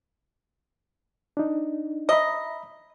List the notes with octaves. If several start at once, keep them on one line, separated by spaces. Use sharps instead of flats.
D4 D#4
D#5 E5 A#5 B5